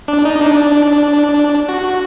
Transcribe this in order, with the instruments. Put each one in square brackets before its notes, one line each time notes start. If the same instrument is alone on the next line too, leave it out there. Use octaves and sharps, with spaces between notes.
[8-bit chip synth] D4
D#4
D4
F#4